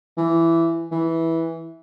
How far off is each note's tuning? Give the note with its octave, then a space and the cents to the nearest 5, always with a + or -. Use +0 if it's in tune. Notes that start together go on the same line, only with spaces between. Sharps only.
E3 +10
E3 -10